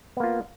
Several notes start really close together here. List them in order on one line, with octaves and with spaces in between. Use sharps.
B3 A#3 F4